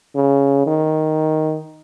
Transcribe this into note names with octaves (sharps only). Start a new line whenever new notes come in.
C#3
D#3